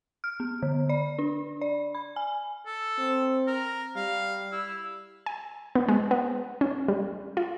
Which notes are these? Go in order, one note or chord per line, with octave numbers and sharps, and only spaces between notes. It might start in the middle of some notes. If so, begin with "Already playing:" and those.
F6
B3
D3
D5
D4
D5
B5
G#5
A4
C4
A#4
G3 F5
E4
G#5
B3
G#3
B3
C#4
G3
F4